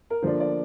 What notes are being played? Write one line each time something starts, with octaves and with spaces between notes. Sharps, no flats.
A#4
D3 F3 A#3 D4 C5
D5